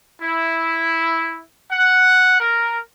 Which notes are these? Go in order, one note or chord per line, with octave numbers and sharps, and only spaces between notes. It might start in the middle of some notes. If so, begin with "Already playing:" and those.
E4
F#5
A#4